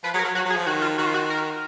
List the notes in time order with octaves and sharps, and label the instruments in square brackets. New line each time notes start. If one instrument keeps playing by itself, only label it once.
[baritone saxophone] F3 [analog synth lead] B4
[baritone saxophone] F#3 [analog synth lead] G#4
[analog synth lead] A#4
[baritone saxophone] F#3
[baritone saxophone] F#3 [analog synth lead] F#4
[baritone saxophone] F#3
[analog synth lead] G#4
[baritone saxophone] F3
[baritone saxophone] D#3 [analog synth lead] F#4
[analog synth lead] F4
[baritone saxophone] D#3 [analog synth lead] F#4
[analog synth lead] F4
F#4
A#4